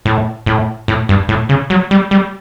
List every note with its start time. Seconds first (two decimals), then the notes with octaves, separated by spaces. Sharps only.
0.06 A2
0.46 A2
0.88 A2
1.09 G2
1.29 A2
1.49 C#3
1.70 F#3
1.91 G3
2.11 G3